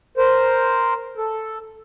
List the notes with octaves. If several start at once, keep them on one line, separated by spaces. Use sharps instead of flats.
A#4 C5
A4